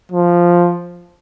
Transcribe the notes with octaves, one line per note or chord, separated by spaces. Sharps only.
F3